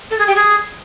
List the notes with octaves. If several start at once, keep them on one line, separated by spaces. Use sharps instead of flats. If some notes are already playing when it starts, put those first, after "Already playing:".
A4
G#4
G4
G#4